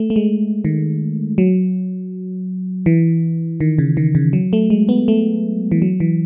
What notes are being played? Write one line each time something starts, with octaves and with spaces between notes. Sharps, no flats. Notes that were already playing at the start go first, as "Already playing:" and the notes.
Already playing: A3
A3
G#3
D#3
F#3
E3
D#3
C#3
D#3
C#3
F#3
A3
G#3
B3
A3
E3
F#3
E3